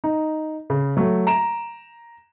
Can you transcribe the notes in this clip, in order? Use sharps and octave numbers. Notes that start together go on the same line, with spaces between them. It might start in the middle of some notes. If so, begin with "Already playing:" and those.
D#4
C#3
F#3 A3
A#5 D7 E7